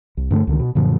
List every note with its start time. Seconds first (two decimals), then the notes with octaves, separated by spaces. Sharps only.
0.17 C2
0.31 G2 D3 G#3 A3
0.47 C#2 D3 D#3
0.60 B2
0.75 F#2 A#2 D3 F3